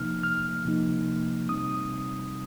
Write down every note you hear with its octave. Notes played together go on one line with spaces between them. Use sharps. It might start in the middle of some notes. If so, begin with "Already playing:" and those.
Already playing: C3 F3 A#3 D#4 F6
F6
C3 F3 A#3 D#4
C3 G3 C4 D#4 D#6